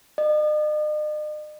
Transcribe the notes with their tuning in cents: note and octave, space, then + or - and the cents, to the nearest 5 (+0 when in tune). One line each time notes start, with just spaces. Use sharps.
D#5 -45